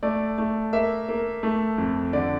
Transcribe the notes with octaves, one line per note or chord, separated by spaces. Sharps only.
A3 D5
A3
A#3 E5
A#3
A3
F2
D3 D5